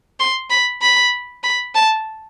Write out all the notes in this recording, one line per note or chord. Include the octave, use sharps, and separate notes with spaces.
C6
B5
B5
B5
A5